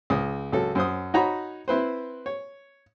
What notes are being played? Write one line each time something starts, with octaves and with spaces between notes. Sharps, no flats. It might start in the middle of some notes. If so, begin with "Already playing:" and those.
C#2 D#6
C#2 F#3 A4
F#2 C5 D#6
D#4 F#4 C#5 F#5 A#5 B5
C4 E4 B4 C5
C#5